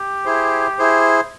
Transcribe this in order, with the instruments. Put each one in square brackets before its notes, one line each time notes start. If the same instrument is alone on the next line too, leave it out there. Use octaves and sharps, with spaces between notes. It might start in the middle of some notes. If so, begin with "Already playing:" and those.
Already playing: [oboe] G4
[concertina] E4 G#4 C5
E4 G#4 C5